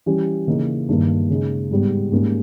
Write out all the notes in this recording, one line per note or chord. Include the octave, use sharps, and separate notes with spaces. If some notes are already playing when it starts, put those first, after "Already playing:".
E3 G3 C#4 G4
C#3 E3 A#3 D#4
G2 D#3 A#3
C#3 G#3 D#4
G#2 G3 B3
G#2 G3 A#3 C#4